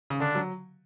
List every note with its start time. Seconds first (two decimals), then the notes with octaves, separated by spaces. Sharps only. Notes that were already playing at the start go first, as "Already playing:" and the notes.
0.10 C#3
0.20 D3 D4
0.35 F#3